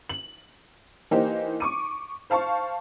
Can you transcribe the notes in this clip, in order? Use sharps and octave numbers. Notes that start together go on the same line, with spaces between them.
F#7
E3 A#3 D#4 G4 C5
C#6 D6 D#7
C5 F5 A5 C#6